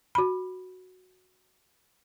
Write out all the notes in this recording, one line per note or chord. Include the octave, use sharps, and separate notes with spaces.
F#4 B5